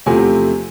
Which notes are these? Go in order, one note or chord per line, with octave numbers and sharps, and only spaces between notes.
E2 C3 F3 A3 C4 G#5